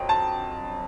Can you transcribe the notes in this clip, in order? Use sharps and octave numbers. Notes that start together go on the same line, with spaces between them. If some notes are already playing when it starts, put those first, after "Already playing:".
Already playing: F2 F#3 G5
A5